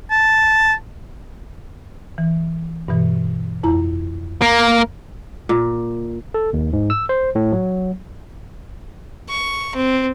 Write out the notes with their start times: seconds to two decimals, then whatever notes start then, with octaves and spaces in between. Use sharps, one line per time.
0.11 A5
2.18 E3
2.88 G2 B2 E3
3.63 F2 E4 A#5
4.42 A#3
5.49 A#2
6.34 A4
6.53 D#2
6.73 G#2
6.90 E6
7.09 C5
7.35 A2
7.52 F#3
9.29 C#6
9.75 C4